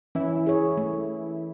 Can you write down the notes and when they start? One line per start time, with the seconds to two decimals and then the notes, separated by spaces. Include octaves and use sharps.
0.15 E3 C#4 E4
0.47 G#4 C#5
0.77 A3